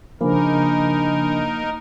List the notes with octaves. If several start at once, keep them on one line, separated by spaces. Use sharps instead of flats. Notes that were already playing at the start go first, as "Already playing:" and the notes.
C#3 F3 A#3 D4 D#4 A#4 G#5 B5